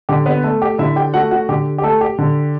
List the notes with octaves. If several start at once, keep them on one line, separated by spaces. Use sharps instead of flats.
D3 G4
B3 B4
A3
G4
D3 E4 E5
G4 G5
A3 F#4 F#5
F#4 F#5
D3 G4
G4
A3 A4
G4
D3